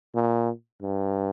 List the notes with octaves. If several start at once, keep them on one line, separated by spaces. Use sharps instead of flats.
A#2
G2